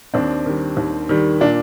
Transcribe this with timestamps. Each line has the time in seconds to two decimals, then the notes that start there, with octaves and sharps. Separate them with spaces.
0.14 D#2 C4 D4
0.46 D#3 G3
0.77 D#2
1.09 D#3 G3
1.41 A#2 D4